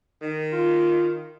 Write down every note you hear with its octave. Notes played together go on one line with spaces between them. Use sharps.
D#3
F4